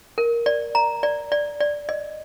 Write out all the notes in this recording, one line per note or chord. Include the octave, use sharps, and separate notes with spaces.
A#4
D5
A#5
D5
D5
D5
D#5